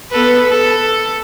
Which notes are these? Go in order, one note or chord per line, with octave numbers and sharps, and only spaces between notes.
B3 A4 B4
A4